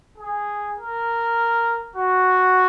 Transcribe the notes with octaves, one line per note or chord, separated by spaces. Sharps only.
G#4
A#4
F#4